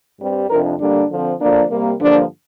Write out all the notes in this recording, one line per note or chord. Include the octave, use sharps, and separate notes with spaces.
G2 G3 C4
F2 C3 F3 D4 A#4
D3 G3 A#3 D4
D3 F3 C4
D3 F3 A#3 D4
C3 G3 A#3
G2 D3 F3 A#3 D4